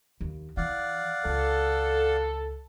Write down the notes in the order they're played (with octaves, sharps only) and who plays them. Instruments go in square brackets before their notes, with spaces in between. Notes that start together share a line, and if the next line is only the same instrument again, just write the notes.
[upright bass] D#2
[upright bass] E3 [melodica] D5 F5 F#5
[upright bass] C#2 [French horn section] A4